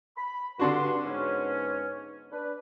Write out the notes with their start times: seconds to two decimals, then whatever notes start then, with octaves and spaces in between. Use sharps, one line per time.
0.17 B5
0.59 G2 D3 D4 F#4 C6
1.06 G#2 B3 C#4
2.32 D4 B4